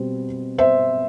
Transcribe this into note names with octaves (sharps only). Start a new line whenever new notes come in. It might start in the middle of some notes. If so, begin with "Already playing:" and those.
Already playing: B2 G3 C4
C5 E5